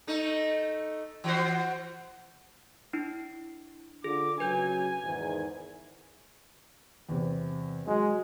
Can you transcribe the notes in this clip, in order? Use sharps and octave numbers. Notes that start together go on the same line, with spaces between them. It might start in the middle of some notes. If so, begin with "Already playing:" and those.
A3 D#4
E3 F#4 C5
D4 E4
D3 F4 G#4 D6
C#3 F#3 B4 G#5 G6
E2 G#2 D#3
E2 C3
F#3 G#3